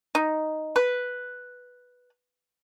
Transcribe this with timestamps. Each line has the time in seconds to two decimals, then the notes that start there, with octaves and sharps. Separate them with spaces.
0.15 D#4
0.76 B4